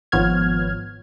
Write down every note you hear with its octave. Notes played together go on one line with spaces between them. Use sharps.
G#1 F3 B3 C#5 F6 G#6